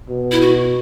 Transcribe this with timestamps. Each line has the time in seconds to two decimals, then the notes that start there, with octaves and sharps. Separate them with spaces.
0.08 B2
0.31 E4
0.41 F#4